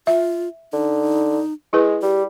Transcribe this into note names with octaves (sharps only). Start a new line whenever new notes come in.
F4 E5
D3 D#4
G#3 E4 G#4 B4
G3 G4